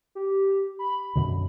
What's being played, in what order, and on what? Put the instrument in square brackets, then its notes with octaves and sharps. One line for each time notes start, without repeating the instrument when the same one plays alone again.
[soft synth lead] G4
B5
[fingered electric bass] F#2 B2 D3